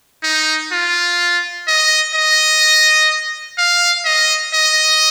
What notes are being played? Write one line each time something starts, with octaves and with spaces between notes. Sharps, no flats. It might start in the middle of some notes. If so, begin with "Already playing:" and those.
D#4
F4
D#5
D#5
F5
D#5
D#5